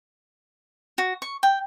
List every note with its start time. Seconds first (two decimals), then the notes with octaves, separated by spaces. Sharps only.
0.98 F#4
1.22 C#6
1.43 G5